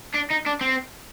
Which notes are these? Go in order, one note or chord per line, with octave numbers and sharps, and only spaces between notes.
D4
D#4
D4
C4